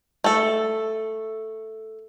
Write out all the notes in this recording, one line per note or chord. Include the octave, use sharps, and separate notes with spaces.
A3 A4